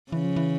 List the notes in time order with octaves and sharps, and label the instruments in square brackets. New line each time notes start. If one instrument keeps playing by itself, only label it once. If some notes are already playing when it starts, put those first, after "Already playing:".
[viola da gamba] C#3 [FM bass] E3
[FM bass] F3
E3